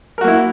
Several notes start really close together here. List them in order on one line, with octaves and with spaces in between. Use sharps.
A#4 F#4 A#3 E4